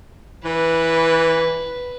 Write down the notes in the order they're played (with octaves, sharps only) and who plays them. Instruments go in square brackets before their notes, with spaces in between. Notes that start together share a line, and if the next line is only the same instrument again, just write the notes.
[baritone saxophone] E3 [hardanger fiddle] B4